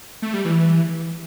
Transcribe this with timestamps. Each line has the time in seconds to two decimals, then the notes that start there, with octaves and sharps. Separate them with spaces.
0.22 A3
0.34 G3
0.45 E3